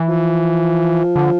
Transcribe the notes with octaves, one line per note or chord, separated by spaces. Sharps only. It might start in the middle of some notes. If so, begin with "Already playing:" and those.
Already playing: E3
F3
D3